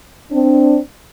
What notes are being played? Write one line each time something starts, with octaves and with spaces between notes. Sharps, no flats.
C4 D4